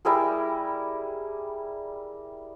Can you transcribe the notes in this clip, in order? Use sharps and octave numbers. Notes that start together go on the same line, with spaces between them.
G3 E4 G#4 A#4